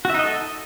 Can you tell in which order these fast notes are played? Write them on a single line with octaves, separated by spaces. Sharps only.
F#4 E5 D#4 D#5 A4